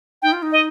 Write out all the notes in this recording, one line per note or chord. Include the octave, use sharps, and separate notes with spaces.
D#4 G5
F4
D#4
D#5